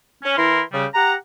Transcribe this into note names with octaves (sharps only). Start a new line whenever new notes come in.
C#4
E3 E4 A#4 C6
C#3 G3
G4 F#5 A#5